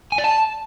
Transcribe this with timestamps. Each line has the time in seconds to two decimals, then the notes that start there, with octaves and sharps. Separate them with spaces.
0.12 G#5
0.18 D5
0.24 A5